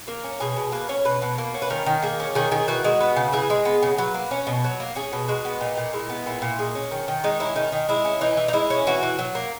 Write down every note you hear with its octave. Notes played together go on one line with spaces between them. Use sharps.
A#3 A#4
C#4
B2 G#4
B2
A#3 B4
C#4 C#5
B2 B4
B2
A#3
C#4
B4
D#3 A#4
D#3
A#3 G#4
C#4
D#3 G#4
D#3 G#4
E3 F#4
G#3
B3
C#3
E3 G#4
G#3
B3
C#3
F#3 B4
A#3
C#4
B2
F#3
A#3
C#4 G#4
B2
G#3 F#4
B3
A#2 D#4
A#2
G#3 E4
B3
A#2 E4
A#2
G#3
C#4
D#3
D#3
G#3 D#4
C#4 E4
D#3 D#4
D#3
G#3 E4
C#4
E3 D#4
E3
D#4
G#3 E4
C#4
E3 F#4
E3
F#3
A#3